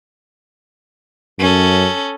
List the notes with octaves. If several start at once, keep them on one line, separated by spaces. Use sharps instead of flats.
F#2 C#4 A4